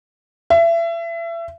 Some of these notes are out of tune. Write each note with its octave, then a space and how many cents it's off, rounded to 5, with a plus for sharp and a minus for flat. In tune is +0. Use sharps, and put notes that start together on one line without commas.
E5 +30